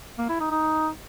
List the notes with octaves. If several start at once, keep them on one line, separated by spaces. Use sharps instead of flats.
A#3
E4
D#4
D#4